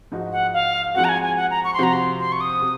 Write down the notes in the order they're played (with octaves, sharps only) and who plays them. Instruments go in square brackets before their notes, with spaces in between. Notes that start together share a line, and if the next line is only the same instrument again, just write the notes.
[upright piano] G#2 F3 G#3 D#4 F#4
[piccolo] F#5
F5
[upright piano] F3 G#3 C4 F#4 [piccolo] F#5
[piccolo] A#5
G#5
G#5
F#5
A#5
C#6
C6
[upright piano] C3 F3 C4 F#4 [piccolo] A#5
[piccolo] C6
C6
C#6
D#6
[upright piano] C3